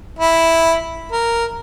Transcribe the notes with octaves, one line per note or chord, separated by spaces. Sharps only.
E4
A#4